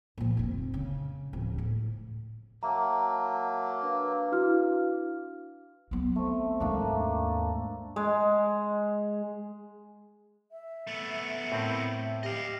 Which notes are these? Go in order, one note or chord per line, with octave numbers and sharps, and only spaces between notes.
A#2 F3
F1 C4
C#3
D1 F3
A2
F#3 A#3 E5 F#5 A5 A#5
D4 B4 F5
E4 F#4 F6
F#3 B3
A3 C4
D#2 G#2 A3 A#3 D4
G#3
E5
A3 B3
A2 C4 A#4
G4 D#5 F5